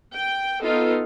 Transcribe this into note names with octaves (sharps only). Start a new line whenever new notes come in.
G5
B3 D#4 F4 A4